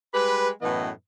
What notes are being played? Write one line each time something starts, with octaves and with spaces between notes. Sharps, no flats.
G3 G#3 G4 B4
F#2 A2 E3 B3 B4 D#5